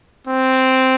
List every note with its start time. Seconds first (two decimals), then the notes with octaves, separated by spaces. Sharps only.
0.27 C4